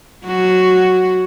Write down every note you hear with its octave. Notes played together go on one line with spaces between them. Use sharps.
F#3 F#4